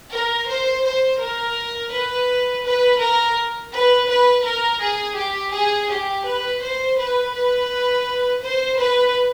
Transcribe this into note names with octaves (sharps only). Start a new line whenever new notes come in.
A#4
C5
C5
A#4
B4
B4
A#4
B4
B4
A#4
G#4
G4
G#4
G4
B4
C5
B4
B4
C5
B4